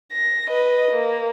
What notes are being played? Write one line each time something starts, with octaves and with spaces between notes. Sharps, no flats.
A#6
B4 D#5
A#3